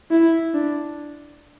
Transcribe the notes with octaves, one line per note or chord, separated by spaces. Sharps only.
E4
D4